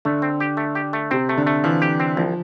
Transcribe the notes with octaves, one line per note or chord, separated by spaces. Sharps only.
D3 A3
C4
G4
A3
G4
A3
C3 C4
A3
D3
A3
E3 F3
G4
C4
C2 F3